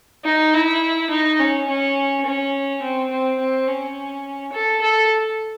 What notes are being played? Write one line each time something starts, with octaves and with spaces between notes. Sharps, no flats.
D#4
E4
D#4
C#4
C#4
C#4
C4
C4
C4
C#4
A4
A4